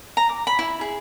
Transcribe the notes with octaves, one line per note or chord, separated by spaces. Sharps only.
A#5
D6
B5
E4
G#4